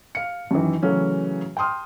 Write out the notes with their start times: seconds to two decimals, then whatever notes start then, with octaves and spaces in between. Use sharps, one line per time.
0.15 F5 C#7
0.51 F#2 D#3 E3
0.83 C#3 E3 F#3 A3 C#4
1.57 G5 A5 C6 D#6 F6